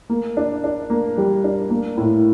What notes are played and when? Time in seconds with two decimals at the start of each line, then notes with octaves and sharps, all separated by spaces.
0.10 A#3
0.37 D4
0.64 D4
0.90 A#3
1.18 G3
1.44 D4
1.70 A#3
1.97 A2